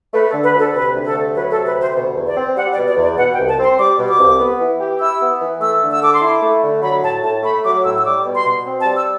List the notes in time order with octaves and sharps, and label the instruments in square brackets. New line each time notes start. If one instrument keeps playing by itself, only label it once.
[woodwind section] A3 [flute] B4
[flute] A4
[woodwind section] D3
[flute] B4
[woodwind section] D2 [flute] A4
[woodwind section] C3 [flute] B4
[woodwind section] D2
[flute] A4
[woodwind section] A3
[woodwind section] F#3 [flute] B4
[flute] A4
[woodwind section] C3
[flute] B4
[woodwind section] D2 [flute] C5
[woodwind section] B2
E2
[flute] D5
[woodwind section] C4
[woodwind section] G3 [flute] F#5
[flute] D5
[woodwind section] B2
[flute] D5
[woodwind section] E2
[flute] D5
[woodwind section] B2 [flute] F#5
[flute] G5
[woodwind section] C2
[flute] A5
[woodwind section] C4 [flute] C6
[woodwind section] G3 [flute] D6
[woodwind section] B2
[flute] D6
[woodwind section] C2
B3
E3
G4
[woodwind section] E4 [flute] E6
[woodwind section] B3
E3
[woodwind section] A3 [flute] E6
[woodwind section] D3
[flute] E6
[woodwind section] A4 [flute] D6
[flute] C6
[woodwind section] E4 [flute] D6
[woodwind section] A3
D3
[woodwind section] F#3 [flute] B5
[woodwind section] A2 [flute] A5
[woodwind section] A2 [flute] A5
[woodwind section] A3 [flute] B5
[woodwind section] F#3 [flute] D6
[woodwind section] A2 [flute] E6
[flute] E6
[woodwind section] G3 [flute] D6
[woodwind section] B2
[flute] C6
[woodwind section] B2
C4
[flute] A5
[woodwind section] G3
[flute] E6